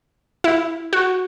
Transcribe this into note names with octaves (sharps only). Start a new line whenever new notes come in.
E4
F#4